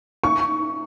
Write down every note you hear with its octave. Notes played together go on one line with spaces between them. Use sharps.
C#6